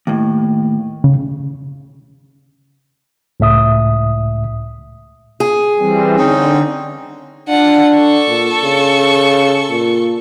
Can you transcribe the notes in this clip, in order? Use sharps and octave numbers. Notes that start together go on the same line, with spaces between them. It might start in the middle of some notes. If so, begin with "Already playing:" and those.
D#2 A2
C#3
C#2 A2 E5 D#6
G#4
E3 G3 C4
D3 C4 C#4 D#4
D4 F4 F#5
A4 C#6
A#2
C#3
A#2